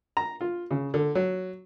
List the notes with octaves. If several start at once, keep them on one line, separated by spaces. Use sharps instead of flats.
A#5
F4
C#3
D3
F#3